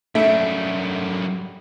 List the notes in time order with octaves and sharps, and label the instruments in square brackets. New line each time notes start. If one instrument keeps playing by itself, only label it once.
[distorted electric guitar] F#2 G3 [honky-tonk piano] A3 [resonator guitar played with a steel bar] E5